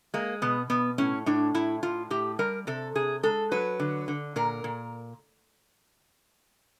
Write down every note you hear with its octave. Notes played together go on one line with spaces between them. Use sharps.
G#3 A#3
B2 B3
B2 B3
A2 C#4
A2 D4
A2 E4
A2 F4
A2 G4
G3 A#4
C3 A4
C3 G#4
G#3 A4
F#3 B4
D3
D3
A#2 A#4
A#2